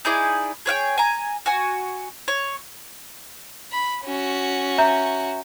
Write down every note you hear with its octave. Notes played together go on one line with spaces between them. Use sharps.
D#4 E4 G#4 D5
G#4 C#5 F#5 G5
G#5 A#5
F#4 G#5
C#5
B5
C#4 F#4
E5 A#5 G6